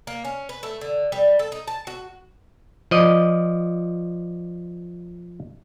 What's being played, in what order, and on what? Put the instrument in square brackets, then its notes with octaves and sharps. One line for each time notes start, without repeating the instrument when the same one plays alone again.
[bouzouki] A#3
C#4
B4
A3
D3
G3
A4
D#4
A5
F#4
[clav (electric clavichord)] F3 D5 D#5